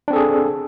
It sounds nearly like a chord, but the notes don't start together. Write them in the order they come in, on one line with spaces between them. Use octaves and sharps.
D4 C4 A4 G#4